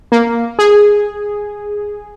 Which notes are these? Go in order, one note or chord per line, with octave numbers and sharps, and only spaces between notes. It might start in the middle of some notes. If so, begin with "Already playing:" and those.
A#3
G#4